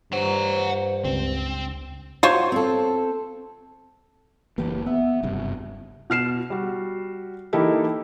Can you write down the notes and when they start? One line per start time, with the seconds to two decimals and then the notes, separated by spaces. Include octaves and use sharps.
0.12 G2 C5 F#5 A#5
1.05 C#2 C4
2.23 F4 F#4 C5 C#5
2.52 C4 A4
4.58 F#1 E3 A#3 G4 B4
4.86 B3 E5
5.23 F#1 G2 C3
6.10 B2 F6 C7 E7
6.50 G3 F#4
7.53 E3 A#3 D#4 E4 G4 A4